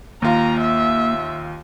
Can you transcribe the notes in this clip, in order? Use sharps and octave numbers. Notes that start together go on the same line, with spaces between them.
D#2 A#3 F4 A#5
E5